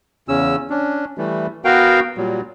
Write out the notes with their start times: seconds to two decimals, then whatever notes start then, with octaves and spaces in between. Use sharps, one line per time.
0.29 E2 C#3 C#4 E6
0.70 C#4 D4
1.18 E3 G3 A3
1.65 B3 F#4 A#4 F5 G5
2.17 A#2 F#3 G3